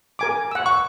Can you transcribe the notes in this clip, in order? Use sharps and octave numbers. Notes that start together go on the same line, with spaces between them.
A#4 G#5 D6
F#5 E6
C#6